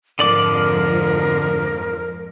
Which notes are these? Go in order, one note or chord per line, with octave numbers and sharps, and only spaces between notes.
F2 G#2 D3 F3 A#4 D5 D6